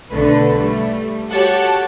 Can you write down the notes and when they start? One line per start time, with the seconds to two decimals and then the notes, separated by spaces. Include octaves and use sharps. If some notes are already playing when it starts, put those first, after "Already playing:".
0.10 B1 D3 A3 B4
0.59 G3 A3
1.30 F#4 G4 A4 C#5 F#5 A5